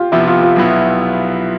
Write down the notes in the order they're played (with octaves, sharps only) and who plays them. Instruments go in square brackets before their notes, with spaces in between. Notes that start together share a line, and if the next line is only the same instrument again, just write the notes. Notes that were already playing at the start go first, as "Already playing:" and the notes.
Already playing: [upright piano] F4 G4
[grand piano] C3 F3 B3 [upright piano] E4
[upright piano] F4
F4
[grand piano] B1 B2 B3 E4